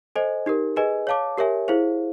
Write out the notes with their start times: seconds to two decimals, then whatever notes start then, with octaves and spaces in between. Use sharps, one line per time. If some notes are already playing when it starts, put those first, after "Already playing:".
0.16 A4 C5 D#5 G#5
0.46 D#4 G4 A#4
0.76 G#4 B4 D#5 G#5
1.07 C#5 F5 A5 D6
1.37 G4 A#4 C#5 E5 G#5
1.68 E4 G#4 C5 F5